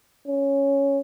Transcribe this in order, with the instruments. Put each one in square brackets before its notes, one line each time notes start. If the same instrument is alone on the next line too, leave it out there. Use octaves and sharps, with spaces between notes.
[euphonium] C#4